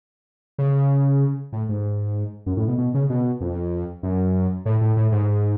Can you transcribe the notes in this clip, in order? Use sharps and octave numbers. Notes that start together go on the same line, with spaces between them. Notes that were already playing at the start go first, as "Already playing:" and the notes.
C#3
A2
G#2
F#2
A2
B2
B2
C#3
B2
F2
F#2
A2
A2
A2
G#2